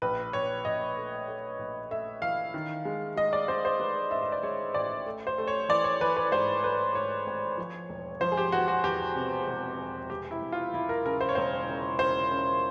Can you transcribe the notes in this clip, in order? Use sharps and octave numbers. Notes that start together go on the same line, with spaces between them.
A#1 B4
A#1 C#5
A#1 D#5
A3
A3
A#1
A3 E5
E3 F5
D#3
G#3
G#3 D#5
D5
G#3 C5
C5
G#3 B4
A1 E5
D#5
D5
G#3 C#5
A1 D5
A3
C5
A3
C#5
E3 D5
C#5
E3 B4
B4
G#2 C5
A3 B4
G#2 C#5
G#1
F3
E1
F3 C5
G#4
G4
E2 F#4
F#4
E2 G4
C3
E1
E2
E1 G4
E4
E1
F4
E1 E4
A#4
C#3 A#4
C5
C#5
E1 C5
C#3
C#3 C5
C#3